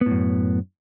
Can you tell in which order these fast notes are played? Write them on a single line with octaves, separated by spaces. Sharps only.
B3 A2 F#2